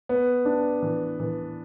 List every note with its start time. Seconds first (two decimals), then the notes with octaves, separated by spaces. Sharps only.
0.09 B3
0.45 D4
0.82 E3
1.20 E3